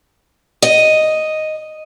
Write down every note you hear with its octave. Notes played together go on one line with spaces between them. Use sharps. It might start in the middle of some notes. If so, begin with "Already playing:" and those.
D#5